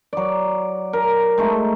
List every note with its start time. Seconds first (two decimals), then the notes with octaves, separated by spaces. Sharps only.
0.13 F#3 D5
0.93 A#4
1.38 G#3 A3 D#4